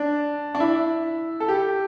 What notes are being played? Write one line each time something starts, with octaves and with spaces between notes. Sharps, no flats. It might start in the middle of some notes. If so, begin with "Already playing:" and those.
Already playing: D4
D4
E4
A4
G4